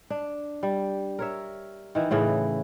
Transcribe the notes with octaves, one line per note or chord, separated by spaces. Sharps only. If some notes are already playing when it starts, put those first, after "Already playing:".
D4
G3
A#4 C#5 E5
D#3 E3
A2 C#3 E3